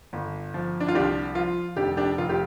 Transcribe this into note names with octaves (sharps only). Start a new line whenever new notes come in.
G1
F3
D4
F4
C2 D4 G4
F3 F4
F1 D4 G4
D4 G4
F1 F4
G4